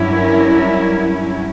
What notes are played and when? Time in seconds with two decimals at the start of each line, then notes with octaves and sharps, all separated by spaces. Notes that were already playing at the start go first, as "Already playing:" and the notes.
Already playing: G2 F#3 C#4 E4
0.12 A#4